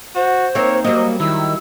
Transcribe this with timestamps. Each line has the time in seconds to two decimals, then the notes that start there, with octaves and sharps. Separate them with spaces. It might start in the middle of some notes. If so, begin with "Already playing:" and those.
0.16 F#4 C5
0.55 A#3 C4 D#4 C#5
0.85 F#3 G3 A#3 D#5
1.20 D#3 E4 E6